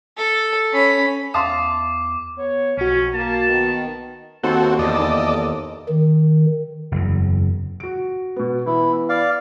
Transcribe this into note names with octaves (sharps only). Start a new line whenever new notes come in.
A4
C#4 B5
E2 E5 F5 A5 C6 D6 D#6
B3 C#5
B1 F2 C#4 F#4
A#3 A5
D#3 B3
D#2 C4 F#4 A4
E2 A4 D5 D#5
D#2
D#3
F#1 E2
F#4 D7
B2 B3
E3 B3 E4
D5 F5